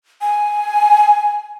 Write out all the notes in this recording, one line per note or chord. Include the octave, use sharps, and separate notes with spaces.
G#5